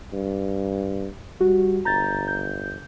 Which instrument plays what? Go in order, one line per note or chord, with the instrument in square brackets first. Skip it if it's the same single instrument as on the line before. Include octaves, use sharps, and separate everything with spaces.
[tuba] G2
[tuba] G3 [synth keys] F#4
[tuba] G1 [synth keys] A#5 G6 A6
[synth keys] G6